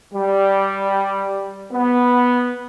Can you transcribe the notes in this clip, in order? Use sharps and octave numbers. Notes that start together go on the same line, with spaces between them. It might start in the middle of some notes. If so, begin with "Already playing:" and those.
G3
B3